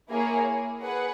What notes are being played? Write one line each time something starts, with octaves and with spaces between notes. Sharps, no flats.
A#3 E4 G#4 C#5
G#4 B4 F#5